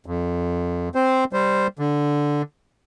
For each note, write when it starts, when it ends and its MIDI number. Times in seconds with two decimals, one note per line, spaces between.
0.06 0.89 41
0.95 1.24 60
0.95 1.24 72
1.33 1.67 55
1.33 1.67 72
1.79 2.42 50